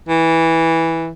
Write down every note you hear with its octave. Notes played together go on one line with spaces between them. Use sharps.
E3